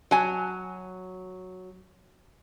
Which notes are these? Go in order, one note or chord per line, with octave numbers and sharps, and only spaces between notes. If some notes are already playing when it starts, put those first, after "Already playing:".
F#3 G#5